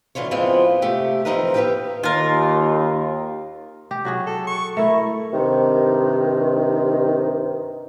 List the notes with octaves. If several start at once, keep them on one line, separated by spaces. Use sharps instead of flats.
D2 D3 E3 F4 C#5
F3 G#3 B3 C4 E4 F4
C3 A3 G4
E3 F3 C4 D#4 A#4 B4
G4 B4 D5 E5 F5 G5
D#2 F4 A#4
G4
F#3 F#4 G#4
A4
C#6
A3 E4 A#4
G2 C3 D#3